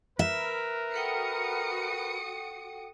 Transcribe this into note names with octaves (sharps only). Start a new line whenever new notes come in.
A#4 B4 E5
F#4 A4 F#5 G5 D#6 C#7